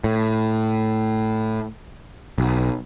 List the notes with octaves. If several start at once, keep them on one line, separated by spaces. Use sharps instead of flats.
A2
B1